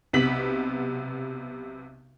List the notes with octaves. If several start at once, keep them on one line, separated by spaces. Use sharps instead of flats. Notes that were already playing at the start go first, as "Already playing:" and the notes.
B1 C3 B3 B6 F#7